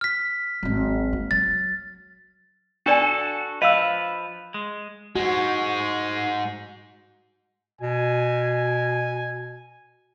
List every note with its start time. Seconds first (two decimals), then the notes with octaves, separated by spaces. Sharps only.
0.01 F6 B6
0.63 G#1 F#3
1.13 A#3
1.31 F#3 A6
2.86 D4 F#4 A4 D5 G#5
3.62 F3 B4 D#5 F5 E6
4.54 G#3
5.16 G#2 G#3 F#4
7.81 B2 G#5